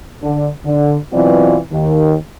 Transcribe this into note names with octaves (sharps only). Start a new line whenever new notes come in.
D3
D3
B2 E3 F#3 C4 F4 D5
D#2 D#3